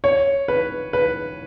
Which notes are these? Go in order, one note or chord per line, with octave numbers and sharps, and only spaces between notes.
C#5
B4
B4